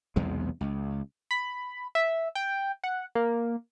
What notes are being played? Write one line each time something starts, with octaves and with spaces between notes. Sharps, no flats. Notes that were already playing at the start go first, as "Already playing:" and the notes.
B1 E2 C3 G#3
C#2
B5
E5
G5
F#5
A#3